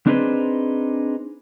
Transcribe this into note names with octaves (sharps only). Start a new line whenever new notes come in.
C4 D4 D#4 G#4 B4 C5